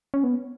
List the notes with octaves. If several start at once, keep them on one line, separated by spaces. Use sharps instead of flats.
C#4
B3